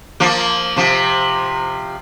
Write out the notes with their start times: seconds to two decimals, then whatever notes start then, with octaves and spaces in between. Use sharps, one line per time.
0.20 F3 A#3
0.76 C3 F3